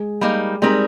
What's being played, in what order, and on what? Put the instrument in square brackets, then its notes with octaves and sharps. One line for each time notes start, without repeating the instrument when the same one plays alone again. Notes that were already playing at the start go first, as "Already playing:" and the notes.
Already playing: [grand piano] G#3 G#4
[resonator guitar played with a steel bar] G3 A#3 D#4
[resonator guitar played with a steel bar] G3 C4 D#4 A#4 [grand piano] G#3 G#4